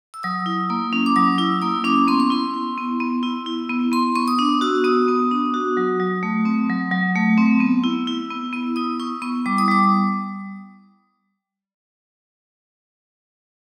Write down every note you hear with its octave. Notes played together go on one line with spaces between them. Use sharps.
E6
F#3 D#6
E4
A#3
C#4
D6
F#3 D#6
E4 E6
A#3 D#6
C#4 D6
B3 C6
C#6
E4 C6
E4
B3
B3
E4
E4
B3
B3 C6
B3 C#6
D#6
D4 D6
F#4 E6
B3 D#6
B3
D4
F#4
F#3
F#3
A3
C4
F#3
F#3
A3
C4
B3
E4
E4
B3
B3 E6
E4 D#6
E4 C#6
B3 C#6
G3 D6
D#6
G3 D6